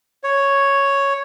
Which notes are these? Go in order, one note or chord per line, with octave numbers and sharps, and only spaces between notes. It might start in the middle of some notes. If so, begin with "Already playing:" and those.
C#5